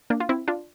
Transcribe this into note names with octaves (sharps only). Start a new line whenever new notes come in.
A#3 D4
F4
C4 E4
D4 F4